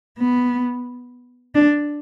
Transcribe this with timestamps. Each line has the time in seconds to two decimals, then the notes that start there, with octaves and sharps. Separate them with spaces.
0.18 B3
1.55 D4